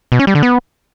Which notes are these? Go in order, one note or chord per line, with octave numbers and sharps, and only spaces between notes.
B2
C#4
G3
D3
B3